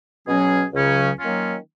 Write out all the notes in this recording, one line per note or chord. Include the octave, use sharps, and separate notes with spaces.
B2 F#3 C#4 G#4
C#2 C#3 F#3 C#4
D#3 F#3 A#3 C#4 F4